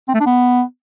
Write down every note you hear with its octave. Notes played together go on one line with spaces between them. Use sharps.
C4
A3
D4
B3